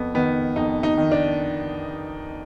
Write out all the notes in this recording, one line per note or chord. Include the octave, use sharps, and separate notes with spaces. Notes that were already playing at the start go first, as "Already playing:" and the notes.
Already playing: F2 B3
D#3 B3
F2 D#4
D#4
D#3
D4